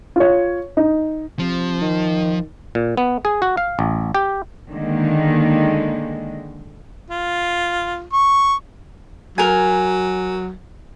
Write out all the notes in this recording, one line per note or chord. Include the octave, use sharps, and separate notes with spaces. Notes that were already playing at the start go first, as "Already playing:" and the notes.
F4 C#5
D#4
C3 F3
D#3
A#2
B3
G#4
F#4
F5
A1
G4
D3 D#3 G#3 A#3
F4
C#6
F#3 A#4 G#5